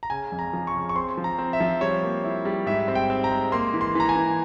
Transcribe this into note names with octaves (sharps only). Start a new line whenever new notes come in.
A#5
C#3 G#5
F2
A#5
F3
C#6
C#3
C#6
C4 C6
F3
A#5
C4
E5
F3
G3 C#5
A#3
E4
G3
G#2 E5
C4
G5
C4
A#5
G#3
A#3 C6
E3
C6
E3 A#5
G#5
E3